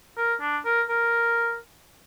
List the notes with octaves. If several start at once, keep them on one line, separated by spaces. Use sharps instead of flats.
A#4
D4
A#4
A#4